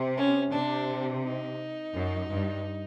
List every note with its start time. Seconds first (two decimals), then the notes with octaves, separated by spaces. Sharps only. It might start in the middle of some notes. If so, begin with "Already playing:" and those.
Already playing: C3
0.17 C#4
0.52 C3 D4
1.24 D#4
1.96 F#2
2.32 G2